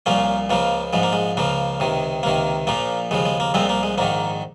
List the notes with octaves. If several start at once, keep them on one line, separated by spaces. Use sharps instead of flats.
C2 A#2 F3 A#3 C#4
C#2 C#3 F3 A#3
A#1 G#2 F3 G#3
A#3
G#3
C#2 C#3 F3 A#3
C#2 C3 D#3
C#2 C3 D#3 A#3
A#1 A#2 F3 A#3
D#2 C#3 F3 G#3
G#3
A#3
C2 A#2 F3 G#3 C4
A#3
G#3
A#1 G#2 D#3 A#3